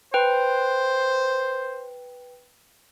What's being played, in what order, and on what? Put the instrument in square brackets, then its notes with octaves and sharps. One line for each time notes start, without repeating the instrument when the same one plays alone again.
[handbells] B4 G5 [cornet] C5